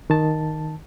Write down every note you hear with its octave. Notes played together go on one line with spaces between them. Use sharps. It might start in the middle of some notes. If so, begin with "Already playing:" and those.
D#3 A5